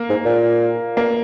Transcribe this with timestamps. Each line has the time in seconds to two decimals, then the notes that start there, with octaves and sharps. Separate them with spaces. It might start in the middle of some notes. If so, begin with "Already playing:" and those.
Already playing: A#3
0.10 G#2
0.25 A#2
0.97 A#3